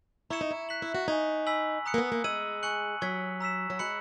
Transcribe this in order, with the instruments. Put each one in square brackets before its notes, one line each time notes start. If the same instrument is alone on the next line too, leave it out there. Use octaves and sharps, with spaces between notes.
[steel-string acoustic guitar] E4 [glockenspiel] A#5 C#6 G#6 C#7 E7
[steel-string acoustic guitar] D#4
E4
[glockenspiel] F#6 B6 F#7
[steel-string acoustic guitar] E4
F#4
[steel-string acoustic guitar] D#4 [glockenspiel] G#5 C#6 G#6
[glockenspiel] G#5 B5 E6 B6 F#7
A#5 D#6 F#6 C#7
[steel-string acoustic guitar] A#3
B3
A#3
[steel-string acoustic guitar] G#3 [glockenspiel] E6 G#6 D#7 F#7
[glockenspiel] G#5 C#6 F#6 C#7 F#7
[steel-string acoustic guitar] F#3 [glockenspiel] C#6 G#6 B6
[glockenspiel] A#5 E6 B6 E7
[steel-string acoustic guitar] F#3
[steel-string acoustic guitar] G#3 [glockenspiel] B5 F#6 C#7 F#7